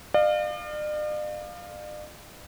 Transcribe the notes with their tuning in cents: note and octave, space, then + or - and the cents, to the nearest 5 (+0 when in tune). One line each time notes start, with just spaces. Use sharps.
D5 +45 F5 +5